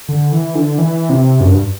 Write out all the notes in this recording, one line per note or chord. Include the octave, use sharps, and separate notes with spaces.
D3
E3
D3
E3
C3
F#2
G2